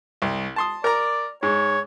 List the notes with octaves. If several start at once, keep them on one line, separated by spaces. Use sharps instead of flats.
C2
A5 C6 D#6
A#4 D5 A#5
G#2 C#5